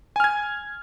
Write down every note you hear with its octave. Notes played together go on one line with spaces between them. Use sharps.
G#5 F6 G#6